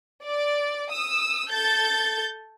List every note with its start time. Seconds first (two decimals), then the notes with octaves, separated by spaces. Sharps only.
0.25 D5
0.91 D#6 E6
1.49 A4 G6 A6